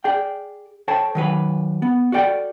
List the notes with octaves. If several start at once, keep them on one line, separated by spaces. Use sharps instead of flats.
G#4 D5 G5
A4 C5 C#5 G5 A5
D#3 F#3 B4
B3
F#4 A4 D5 G5